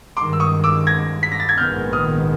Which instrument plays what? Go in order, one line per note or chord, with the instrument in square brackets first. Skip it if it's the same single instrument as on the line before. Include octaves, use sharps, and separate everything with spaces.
[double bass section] G2 D#3 G#3 [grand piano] C6 D6
[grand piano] E6
C#6 D#6
D6 E6
G#6 A#6
B6
A#6
A6
G#6
[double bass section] A#1 G#2 D#3 G#3 B3 [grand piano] F6 G6
[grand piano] D#6 F6